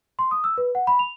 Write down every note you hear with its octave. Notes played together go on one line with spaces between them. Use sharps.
C6
D#6
E6
B4
F#5
B5
F7